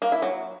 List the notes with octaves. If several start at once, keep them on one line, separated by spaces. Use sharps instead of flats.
A#3
E4
F#3